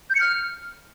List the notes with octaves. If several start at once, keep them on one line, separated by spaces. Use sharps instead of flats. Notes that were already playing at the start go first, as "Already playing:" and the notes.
G6
C#7
F6